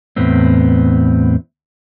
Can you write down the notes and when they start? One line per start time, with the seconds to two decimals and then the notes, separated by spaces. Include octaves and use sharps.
0.16 E2 A2 B3 C4